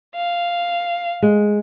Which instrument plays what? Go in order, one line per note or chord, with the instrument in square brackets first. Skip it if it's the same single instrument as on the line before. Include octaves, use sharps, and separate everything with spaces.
[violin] F5
[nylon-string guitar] G#3